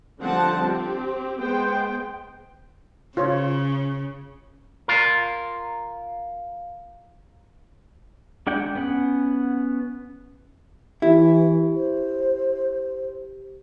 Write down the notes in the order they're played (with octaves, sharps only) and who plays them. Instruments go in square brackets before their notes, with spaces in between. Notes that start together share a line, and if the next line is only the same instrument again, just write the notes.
[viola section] D3 F3 G3 C4 F#5 A5
C4 G4
G#3 B3 C5 G5
[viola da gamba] C#3 [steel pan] F4 C5 C#5
[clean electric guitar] F4 A#4
[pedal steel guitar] G#3 D4 F#5 G5 G6
B3 C#4 F#5
[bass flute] E3 [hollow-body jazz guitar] E4 [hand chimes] G4
[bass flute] C5